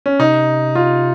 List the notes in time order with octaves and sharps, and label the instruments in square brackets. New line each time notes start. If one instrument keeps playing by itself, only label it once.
[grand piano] C#4
[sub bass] C3 [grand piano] D#4
[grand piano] F4